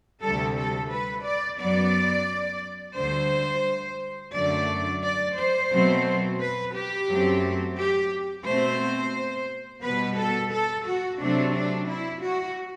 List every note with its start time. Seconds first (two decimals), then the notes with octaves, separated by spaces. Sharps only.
0.22 D2 C3 G3 A4
0.57 A4
0.91 B4
1.24 D5
1.59 F#2 F#3 B3 D5
2.96 D2 D3 G3 C5
4.34 F#2 D3 F#3 A3 D5
5.03 D5
5.38 C5
5.72 B2 F#3 A3 C4
6.40 B4
6.74 G4
7.09 F#2 F#3 A3 C4
7.78 G4
8.46 B2 A3 C4 C5
9.83 B2 G3 B3 B4
10.17 A4
10.52 A4
10.87 F#4
11.21 C3 F#3 A3 C4 D4
11.55 D4
11.89 E4
12.23 F#4